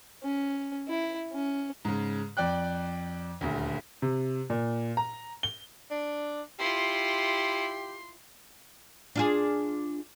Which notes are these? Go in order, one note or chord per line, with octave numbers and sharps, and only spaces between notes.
C#4
E4
C#4
G#2 C#3
F2 D5 G5 F#6
D#1 D2
C3
A#2
A#5
G7
D4
E4 F4 G4 C6
D4 F4 G#4